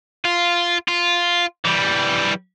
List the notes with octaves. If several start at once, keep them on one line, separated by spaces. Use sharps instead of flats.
F4
F4
E3 G3